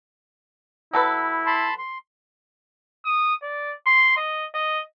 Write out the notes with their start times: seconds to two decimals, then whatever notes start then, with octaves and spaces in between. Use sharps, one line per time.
0.93 F#3 E4 A4 B4
1.46 A5 B5 C6
1.78 C6
3.05 D#6
3.43 D5
3.86 C6
4.17 D#5
4.54 D#5